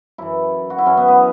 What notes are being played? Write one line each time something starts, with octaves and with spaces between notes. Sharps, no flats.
F#2 E3 E4
F#4
E4
F#2 E3 C#4
B3
B3